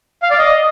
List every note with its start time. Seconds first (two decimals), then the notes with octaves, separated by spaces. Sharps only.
0.23 F5
0.30 D5
0.38 D#5